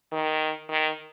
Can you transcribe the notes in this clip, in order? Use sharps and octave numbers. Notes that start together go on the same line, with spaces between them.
D#3
D#3